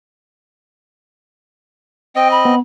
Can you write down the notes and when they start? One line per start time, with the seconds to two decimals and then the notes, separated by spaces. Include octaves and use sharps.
2.16 C4 D#5 G5
2.31 B5
2.45 B3